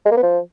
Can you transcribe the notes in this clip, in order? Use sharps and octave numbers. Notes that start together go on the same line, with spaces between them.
G#3
A#3
B3
F3